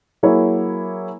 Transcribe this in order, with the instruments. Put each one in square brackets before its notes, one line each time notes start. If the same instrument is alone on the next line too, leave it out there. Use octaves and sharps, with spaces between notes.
[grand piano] F#3 A#3 E4 G#4 C#5